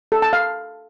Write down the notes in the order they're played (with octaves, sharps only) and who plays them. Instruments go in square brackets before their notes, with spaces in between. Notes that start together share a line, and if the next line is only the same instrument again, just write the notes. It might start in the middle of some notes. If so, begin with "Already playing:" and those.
[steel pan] A4
A5
F5